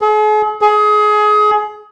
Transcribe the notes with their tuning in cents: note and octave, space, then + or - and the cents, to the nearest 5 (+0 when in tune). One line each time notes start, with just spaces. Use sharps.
G#4 +45
G#4 +25